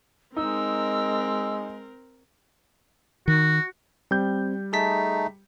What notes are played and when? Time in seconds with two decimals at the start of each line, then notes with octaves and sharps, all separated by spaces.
0.37 G#3 C4 D#4 A#4 E6
3.28 D#3 F#4
4.11 G3 C4 G6
4.73 A3 D#4 G#4 A5 B6